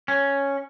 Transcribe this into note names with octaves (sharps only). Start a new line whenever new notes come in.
C#4